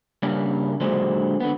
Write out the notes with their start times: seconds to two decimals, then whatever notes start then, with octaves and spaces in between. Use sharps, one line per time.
0.23 G2 C#3 G3 A#3 C#4 D4
0.80 A#2 D3 F#3 G#3 D4 C5
1.40 D3 B3